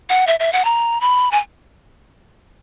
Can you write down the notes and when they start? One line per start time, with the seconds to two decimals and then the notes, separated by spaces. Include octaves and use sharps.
0.10 F#5
0.27 E5
0.40 E5
0.53 F#5
0.65 A#5
1.01 B5
1.31 G#5